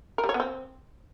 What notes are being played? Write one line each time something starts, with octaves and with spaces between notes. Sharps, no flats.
A#4
G3
C#5
B3
C4